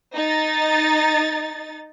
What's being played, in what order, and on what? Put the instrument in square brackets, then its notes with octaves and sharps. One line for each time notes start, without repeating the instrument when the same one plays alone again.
[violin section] D#4 A6